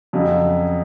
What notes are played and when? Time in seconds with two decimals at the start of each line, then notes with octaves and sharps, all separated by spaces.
0.13 F2 C#3 F#3